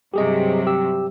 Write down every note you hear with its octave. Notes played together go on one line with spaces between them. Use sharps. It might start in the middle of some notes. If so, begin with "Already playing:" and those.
G2 C3 F#3 G4 G#4 D#5
G4 E6